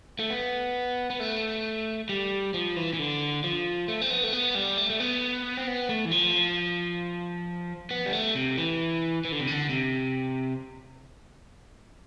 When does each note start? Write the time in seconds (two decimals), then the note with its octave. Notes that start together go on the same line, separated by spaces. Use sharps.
0.19 A3
0.30 B3
1.10 B3
1.20 A3
2.09 G3
2.54 F3
2.76 E3
2.94 E3
2.99 D3
3.44 F3
3.88 A3
4.01 C4
4.11 B3
4.24 A3
4.33 B3
4.55 G3
4.78 A3
4.90 A3
5.00 B3
5.57 C4
5.67 B3
5.89 A3
6.05 E3
6.11 F3
7.91 B3
8.06 G3
8.13 A3
8.35 C3
8.58 E3
9.25 E3
9.32 D3
9.40 C3
9.47 D3
9.69 C3